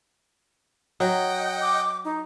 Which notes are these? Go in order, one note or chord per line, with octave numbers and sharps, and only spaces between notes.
F#3 D#5 F#5 G5
D6
D#4